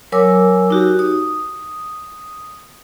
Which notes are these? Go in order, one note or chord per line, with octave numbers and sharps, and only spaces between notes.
F#3 A#4 C#5 G#5 D6 E6
D#4 F#4 G4
D#6